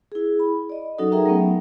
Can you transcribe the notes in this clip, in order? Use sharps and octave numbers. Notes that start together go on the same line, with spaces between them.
E4 G#4
B5
D5 D#5
F#3 C#4 D#4 F#4 A4 D#6
D#4 G#4 A#4 E5 G5 A#5
F#3 A3 B3 C#4